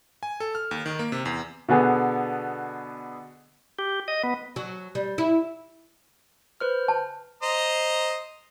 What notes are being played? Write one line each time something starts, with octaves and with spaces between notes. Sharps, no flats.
G#5
A4
F6
D#2
D#3
A#3
C3
E2
B2 D3 B3 G#4
G4
D#5
B3
F#3
G3
E4
B4 C5 F6
A5
C5 D#5 A#5